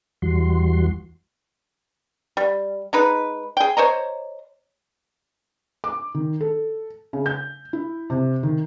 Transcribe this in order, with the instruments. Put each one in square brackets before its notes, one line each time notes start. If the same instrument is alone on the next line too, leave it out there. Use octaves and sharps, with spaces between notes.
[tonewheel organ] E2 E3 G3 F#4 C6
[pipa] G3
G#3 D#4 B4
G#4 G5
C5 C#5 D#5 A#5
[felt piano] D6
D#3
A4
C#3
G6
E4
C3
D#3